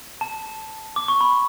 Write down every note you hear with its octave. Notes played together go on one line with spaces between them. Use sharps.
A5
D6
C#6
B5